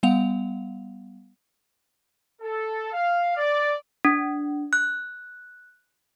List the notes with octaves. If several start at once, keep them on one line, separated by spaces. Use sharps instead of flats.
G3 B3 F5 F#5 F7
A4
F5
D5
D4
F#6